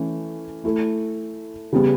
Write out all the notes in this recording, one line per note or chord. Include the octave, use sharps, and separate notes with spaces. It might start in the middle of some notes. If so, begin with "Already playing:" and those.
Already playing: E3 A3 C#4
A3 E4 A4
C#3 G3 B3